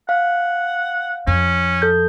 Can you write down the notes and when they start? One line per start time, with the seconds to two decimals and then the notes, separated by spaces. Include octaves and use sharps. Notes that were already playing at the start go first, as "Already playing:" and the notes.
0.09 F5 F#5
1.27 F2 C#4
1.82 A4 G6